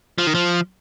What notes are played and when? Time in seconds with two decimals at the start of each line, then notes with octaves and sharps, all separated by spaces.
0.18 F3
0.27 D#3
0.35 F3